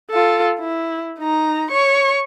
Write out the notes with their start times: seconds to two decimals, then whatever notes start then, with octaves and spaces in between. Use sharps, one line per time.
0.10 F4 A4
0.60 E4
1.20 D#4 A#5
1.71 C#5 C#6